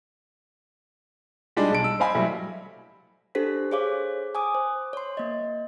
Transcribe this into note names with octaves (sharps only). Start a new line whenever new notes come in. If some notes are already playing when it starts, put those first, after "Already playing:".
G3 G#3 D4 D#4
B1 A5 D7
E6
C5 D#5 F5 G#5 B5
F#3 G3 A3 E4
D4 G4 A4 C5 B6
G#4 C5 C#5 F5 D6
G#5 D6 D#6
C5
C#5 C6
A#3 D#5